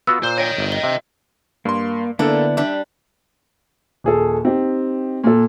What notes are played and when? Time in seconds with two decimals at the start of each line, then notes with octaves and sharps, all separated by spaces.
0.07 B3 F4 F#4 E6
0.23 A#2 C5
0.38 C#5 D#5 G5
0.58 G1
0.72 G7
0.83 C3 E5
1.65 G2 A#3 C6
2.19 D3 A#3 B3 D4 E4 A4
2.57 G3 D4 E5
4.04 D#1 G#4 A4
4.45 C4 D#4 G4
5.24 A#2 A4